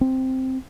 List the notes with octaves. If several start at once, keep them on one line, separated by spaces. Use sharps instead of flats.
C4